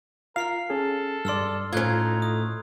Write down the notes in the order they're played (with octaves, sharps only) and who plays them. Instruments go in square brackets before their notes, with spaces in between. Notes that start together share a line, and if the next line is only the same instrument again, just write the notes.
[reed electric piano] F4 F5 [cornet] A#4 [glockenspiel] F6 C7 F7
[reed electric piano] C#4 G#4 [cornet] A4
[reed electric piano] G2 D5 [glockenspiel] C6 E6 F6
[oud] A2 C#4 [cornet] D#4 [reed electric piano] F4 [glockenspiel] F#6 G#6
[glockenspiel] D#6